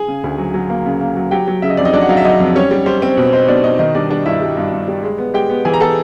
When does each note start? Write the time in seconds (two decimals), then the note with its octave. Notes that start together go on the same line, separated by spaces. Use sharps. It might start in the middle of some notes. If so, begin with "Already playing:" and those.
Already playing: G#4 G#5
0.08 C#3
0.24 D2
0.38 F#3
0.54 F#3
0.70 A#3
0.86 C#3
1.01 A#3
1.16 F#3
1.31 F#3 G4 G5
1.48 F#3
1.62 C#3 E5
1.70 D#5
1.77 F2 D5
1.85 D#4 D#5
1.93 F#3 D4 D5
2.01 F#5
2.09 F#3 F5
2.17 E5
2.25 F#3 D#4 D#5
2.40 F2
2.55 G3 C#4 C#5
2.71 G3
2.86 G3 C5
3.02 C4
3.17 B2
3.33 D#4 C5
3.48 B2 D4 D5
3.64 B2 D#4 D#5
3.79 D#3 D#4 D#5
3.95 G3 D4 D5
4.10 G3 D4 D5
4.26 G2 E4 E5
4.41 G3
4.57 G2
4.72 G2
4.88 G3
5.03 G#3
5.18 B3
5.34 G#3 G4 G5
5.50 B3
5.65 E3 G#4 G#5
5.74 A#5
5.80 B3 A4 A5